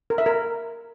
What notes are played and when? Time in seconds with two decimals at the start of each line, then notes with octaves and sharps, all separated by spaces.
0.10 A#4
0.18 E5
0.26 A#4